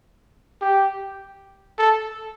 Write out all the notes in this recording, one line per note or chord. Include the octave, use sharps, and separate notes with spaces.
G4
A4